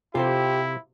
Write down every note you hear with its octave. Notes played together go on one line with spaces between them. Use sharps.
C3 E4 F4 G4 A4 C5